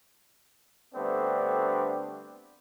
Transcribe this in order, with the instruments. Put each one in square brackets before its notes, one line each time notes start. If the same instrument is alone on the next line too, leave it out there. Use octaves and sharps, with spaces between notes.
[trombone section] D3 G3 A3 B3 C4 D4